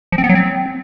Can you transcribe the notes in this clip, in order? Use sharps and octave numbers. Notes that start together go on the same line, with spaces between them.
F3
C4
B3
F#3
C4